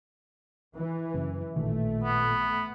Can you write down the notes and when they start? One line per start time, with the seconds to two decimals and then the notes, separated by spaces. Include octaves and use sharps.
0.76 E3
1.14 F#2 C#3
1.56 A1 A#2 D#3 A3
2.04 B3